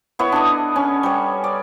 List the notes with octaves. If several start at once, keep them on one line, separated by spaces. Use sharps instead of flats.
B3 E4 C#5
D4 A4 D#5
C#4
G3 C#5
D5